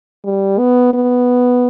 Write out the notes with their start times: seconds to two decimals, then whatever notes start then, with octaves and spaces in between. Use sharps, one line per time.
0.25 G3
0.58 B3
0.93 B3